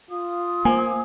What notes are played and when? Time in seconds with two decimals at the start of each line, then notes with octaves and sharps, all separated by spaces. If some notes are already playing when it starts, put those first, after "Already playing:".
0.11 F4 D#6
0.65 A#3 C5 G#5